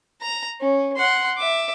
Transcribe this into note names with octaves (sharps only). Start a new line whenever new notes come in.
A#5
C#4
F#5 C6
E5 D6